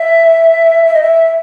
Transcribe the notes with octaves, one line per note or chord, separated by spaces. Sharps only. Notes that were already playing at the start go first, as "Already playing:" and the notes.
Already playing: E5
E5
D#5
E5